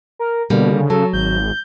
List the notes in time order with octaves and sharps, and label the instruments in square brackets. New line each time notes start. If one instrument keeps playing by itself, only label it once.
[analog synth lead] A#4
[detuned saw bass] B2 [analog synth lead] D3 [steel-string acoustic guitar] G3 A#3
[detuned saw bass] C#3
[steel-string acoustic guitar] F#3 [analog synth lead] A4
[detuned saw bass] G#1 [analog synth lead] G6